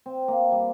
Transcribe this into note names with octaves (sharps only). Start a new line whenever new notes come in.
C4
A#3
G3